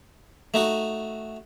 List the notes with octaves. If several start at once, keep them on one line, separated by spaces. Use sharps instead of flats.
A3 D#4 F#4